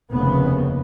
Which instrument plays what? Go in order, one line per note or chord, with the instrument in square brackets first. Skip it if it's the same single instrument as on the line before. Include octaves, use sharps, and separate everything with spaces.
[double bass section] F1 D#2 C#3 B3